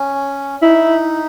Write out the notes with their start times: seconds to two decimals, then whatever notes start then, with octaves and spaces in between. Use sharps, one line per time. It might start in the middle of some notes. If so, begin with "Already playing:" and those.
Already playing: C#4
0.62 D#4 E4